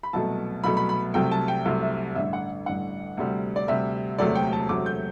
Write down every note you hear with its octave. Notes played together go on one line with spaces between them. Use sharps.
B5
C2 B2 F#3 A3 A5
C2 B2 F#3 A3 B5
B5
B5
C2 C3 F#3 A3 G5
A5
G5
C2 C3 F#3 A3
E5
A1 G2 D3 E5
F#5
A1 G2 D3 F#5
D2 C3 G3
D5
D2 C3 G3 E5
E1 D2 C3 F#3 A3 D5
G5
A5
E1 D2 C3 F#3 A3 D6
G6